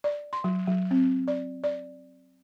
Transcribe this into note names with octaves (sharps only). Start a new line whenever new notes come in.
D5
C6
F#3
F#3
C4
D5
D5